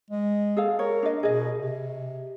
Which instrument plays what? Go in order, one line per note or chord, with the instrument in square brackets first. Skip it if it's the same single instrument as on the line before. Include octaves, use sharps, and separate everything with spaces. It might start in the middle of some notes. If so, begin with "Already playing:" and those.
[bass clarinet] G#3
[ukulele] G#4 A4 F5
[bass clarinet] A#4 [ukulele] C#5
[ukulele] D4 D#5
[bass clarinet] B2 [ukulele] G#4 D#5
[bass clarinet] C3